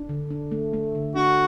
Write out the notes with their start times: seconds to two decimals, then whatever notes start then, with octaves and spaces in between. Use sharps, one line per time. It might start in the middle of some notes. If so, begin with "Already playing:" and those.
Already playing: D4
0.09 D3
0.31 D4
0.51 A3
0.73 A3
0.95 D3
1.16 D4 F#4